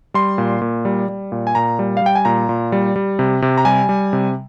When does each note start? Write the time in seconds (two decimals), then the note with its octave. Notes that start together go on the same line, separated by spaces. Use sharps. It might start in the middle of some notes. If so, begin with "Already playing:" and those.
0.14 G3 C6
0.38 A#2
0.62 A#2
0.85 G3
1.09 G3
1.32 A#2
1.47 G#5
1.55 A#2 A#5
1.79 G3
1.97 F5
2.01 G3 G5
2.15 G#5
2.25 A#2 A#5
2.49 A#2
2.72 G3
2.96 G3
3.19 C3
3.42 C3
3.58 A#5
3.65 G3 G#5
3.89 G3
4.13 C3